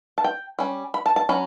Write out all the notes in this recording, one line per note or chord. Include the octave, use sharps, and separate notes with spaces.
A5
G5
G3 C#4
B5
A5
A5
F#3 C#4 B5